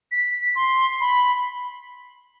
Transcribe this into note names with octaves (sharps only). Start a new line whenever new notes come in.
B6
C6
B5